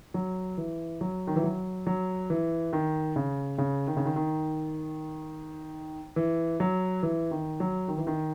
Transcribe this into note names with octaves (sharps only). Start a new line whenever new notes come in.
F#3
E3
F#3
D#3
E3
F#3
F#3
E3
D#3
C#3
C#3
D#3
C#3
D#3
D#3
E3
F#3
E3
D#3
F#3
D#3
E3
D#3